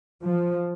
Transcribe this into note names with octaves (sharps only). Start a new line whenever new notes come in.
F3